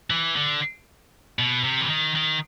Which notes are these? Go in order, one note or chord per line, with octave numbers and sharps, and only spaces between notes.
E3
D3
B2
C3
E3
D#3
D#3